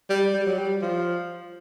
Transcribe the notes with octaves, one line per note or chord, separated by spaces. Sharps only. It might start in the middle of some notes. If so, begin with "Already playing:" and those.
G3
G3
F#3
G3
F3